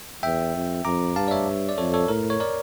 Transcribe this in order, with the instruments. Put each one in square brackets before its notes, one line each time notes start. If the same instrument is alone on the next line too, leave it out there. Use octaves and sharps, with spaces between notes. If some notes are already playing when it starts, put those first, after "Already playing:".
[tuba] E2 [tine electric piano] E5 G5
[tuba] F2
[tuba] F2 [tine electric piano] A#5 D6
[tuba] G2 [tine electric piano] F5 A5
[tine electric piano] D5
C#5 E5
D5
[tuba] F2 [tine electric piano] A4 C#5
[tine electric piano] A4 C#5
[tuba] A2 [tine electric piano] A#4
[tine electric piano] C#5
A#4 D5